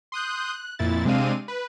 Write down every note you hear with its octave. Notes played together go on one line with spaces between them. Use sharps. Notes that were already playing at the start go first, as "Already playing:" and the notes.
C6 D#6 F#6 G6
F#6
F2 A#2 E4 A6
C3 G#3 C4 D4 F5 D#7
B4